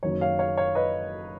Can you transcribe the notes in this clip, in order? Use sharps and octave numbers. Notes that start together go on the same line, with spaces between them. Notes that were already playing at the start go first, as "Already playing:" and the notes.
F#1 F#2 D#3 C#5
C#5 F5
C#5 F5
C#5 F5
B4 D#5